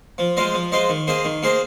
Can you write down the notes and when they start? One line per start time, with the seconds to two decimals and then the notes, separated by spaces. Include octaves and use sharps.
0.18 F3
0.37 G#3 F4 C5 D#5
0.54 F3
0.72 G#3 F4 C5 D#5
0.89 D#3
1.07 A#3 G#4 C5 D#5
1.25 D#3
1.43 A#3 G#4 C5 D#5